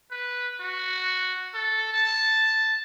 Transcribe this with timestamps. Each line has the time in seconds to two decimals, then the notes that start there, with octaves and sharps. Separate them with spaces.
0.11 B4
0.60 F#4
1.54 A4
1.93 A5